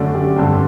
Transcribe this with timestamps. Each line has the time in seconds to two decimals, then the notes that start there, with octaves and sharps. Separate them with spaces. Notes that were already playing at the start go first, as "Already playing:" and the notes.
Already playing: F#2 D3 A3 D5
0.15 G4
0.36 G2 D3 A3 C4